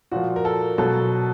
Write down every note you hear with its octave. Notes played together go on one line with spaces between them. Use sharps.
A#2 F3 F#4
A#4
A4
B2 F#3 A4